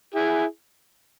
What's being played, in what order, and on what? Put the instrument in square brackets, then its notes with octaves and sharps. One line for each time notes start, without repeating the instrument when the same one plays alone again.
[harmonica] E4 G#4